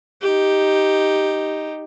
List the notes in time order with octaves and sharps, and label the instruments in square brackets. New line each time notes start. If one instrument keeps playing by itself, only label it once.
[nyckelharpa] D#4 G4